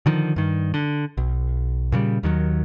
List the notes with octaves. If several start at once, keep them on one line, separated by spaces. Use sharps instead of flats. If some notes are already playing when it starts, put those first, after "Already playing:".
D3 D#3 F3
G2 D#3
D3
B1
A#2 C#3 F#3 G3
D#2 D#3 E3 F#3